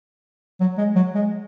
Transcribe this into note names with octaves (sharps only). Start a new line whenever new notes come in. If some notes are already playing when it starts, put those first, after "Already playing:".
F#3
G#3
F#3
G#3